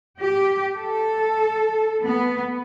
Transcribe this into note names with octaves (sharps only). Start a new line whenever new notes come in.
G4
A4
B3